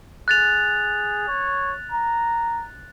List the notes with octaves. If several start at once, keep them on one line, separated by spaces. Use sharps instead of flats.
G#4 F#6 A6 F7
C#5
A#5